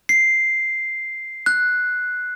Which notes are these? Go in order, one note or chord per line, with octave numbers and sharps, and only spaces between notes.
C7
F#6